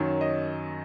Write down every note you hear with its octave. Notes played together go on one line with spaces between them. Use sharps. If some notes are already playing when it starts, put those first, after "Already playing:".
Already playing: F#2 D#3 F#3
D#5